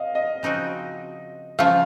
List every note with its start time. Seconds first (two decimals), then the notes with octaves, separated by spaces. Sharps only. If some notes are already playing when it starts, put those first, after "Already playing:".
Already playing: D#5 F5
0.15 D#5
0.43 C#3 F3 C4 D#4 F#4
1.59 C#3 F3 A3 F5